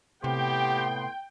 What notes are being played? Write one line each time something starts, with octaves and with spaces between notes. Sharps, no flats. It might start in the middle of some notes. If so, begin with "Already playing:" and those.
A2 C3 B3 G4 G5 C6